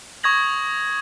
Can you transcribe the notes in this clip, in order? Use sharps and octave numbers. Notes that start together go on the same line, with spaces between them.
C#6 D#6 G#6 A#6 F#7